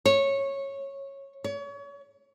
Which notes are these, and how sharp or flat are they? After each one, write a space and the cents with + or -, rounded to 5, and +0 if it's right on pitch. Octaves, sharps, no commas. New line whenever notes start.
C#5 -15
C#5 +35